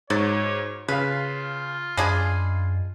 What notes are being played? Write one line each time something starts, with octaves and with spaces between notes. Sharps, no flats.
G#2 F#3 C#5 A6
C#3 F4 B4 F5
F#2 G#3 D4 G#4 F5 B5